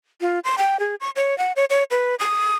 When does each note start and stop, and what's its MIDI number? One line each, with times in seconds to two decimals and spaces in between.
0.21 0.39 65
0.44 0.56 84
0.58 0.79 79
0.80 0.95 68
1.00 1.10 85
1.16 1.37 73
1.38 1.52 78
1.56 1.65 73
1.70 1.84 73
1.91 2.15 71
2.19 2.56 87